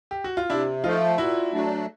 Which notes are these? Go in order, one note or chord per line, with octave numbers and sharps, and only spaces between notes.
G4
F#4
F4
C3 D4 E4
F3 A3 D#4 F4
A#2 E4 F#4
F#3 A3 D4